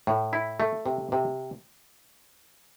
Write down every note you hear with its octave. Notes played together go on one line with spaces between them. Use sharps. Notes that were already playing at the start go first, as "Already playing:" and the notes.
A2
E4
A3
C3
C3